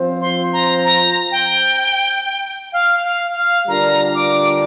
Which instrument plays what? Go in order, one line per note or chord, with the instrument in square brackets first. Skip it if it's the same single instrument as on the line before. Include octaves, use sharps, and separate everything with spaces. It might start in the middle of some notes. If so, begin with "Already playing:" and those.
Already playing: [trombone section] F3 C4 F4 C5
[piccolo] C6
A#5
A#5
G5
F5
F5
F5
[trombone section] D3 G3 D4 F4 A#4 [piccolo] A#5
[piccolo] D6